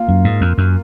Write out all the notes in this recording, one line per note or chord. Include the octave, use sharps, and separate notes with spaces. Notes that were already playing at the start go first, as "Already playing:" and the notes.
Already playing: A#3 F4
F#2
G#2
F2
F#2